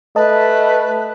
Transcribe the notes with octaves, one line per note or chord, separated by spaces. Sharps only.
A3 B4 D#5 A5